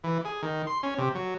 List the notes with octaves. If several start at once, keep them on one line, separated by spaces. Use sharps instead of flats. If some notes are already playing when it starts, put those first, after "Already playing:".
E3
G#4
D#3
C6
C#4
C3
F#3